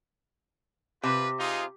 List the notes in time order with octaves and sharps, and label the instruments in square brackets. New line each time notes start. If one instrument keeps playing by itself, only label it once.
[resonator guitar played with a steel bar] C3 [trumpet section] F4 B4
[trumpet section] D#4 F4 G#4